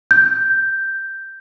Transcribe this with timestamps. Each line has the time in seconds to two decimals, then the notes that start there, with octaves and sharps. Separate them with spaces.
0.11 G6